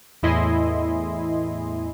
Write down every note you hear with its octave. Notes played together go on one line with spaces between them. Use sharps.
E2 A2 E4 D#5 G#5 C6